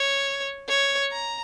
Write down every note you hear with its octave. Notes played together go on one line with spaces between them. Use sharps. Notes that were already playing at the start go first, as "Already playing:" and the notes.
Already playing: C#5
C#5
A#5